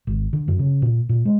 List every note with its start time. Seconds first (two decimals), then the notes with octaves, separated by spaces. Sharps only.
0.07 G#1
0.33 D3
0.48 F#2
0.59 C#3
0.82 A#2
1.09 A#2
1.25 G#3